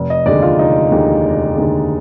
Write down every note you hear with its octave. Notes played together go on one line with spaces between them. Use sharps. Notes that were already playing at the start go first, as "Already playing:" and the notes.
Already playing: F1
D#5
D#2 D3 G#3 D5
F4
F1 D#4
D#2 D3 G#3
F1
D#2 D3 G#3